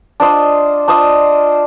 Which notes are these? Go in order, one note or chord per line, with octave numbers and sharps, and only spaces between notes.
D4 F4 C5 D#5
D4 F4 C5 D#5